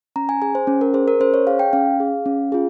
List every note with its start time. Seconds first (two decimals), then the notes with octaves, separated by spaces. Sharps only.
0.16 C#4 A#5
0.29 G#5
0.42 G#4 G#5
0.55 C5
0.67 C#4
0.81 A#4
0.94 G#4 C5
1.08 A#4
1.20 C#4 C5
1.34 C#5
1.47 G#4 F5
1.59 G5
1.73 C#4 F5
2.00 G#4
2.26 C#4
2.52 F4 G#4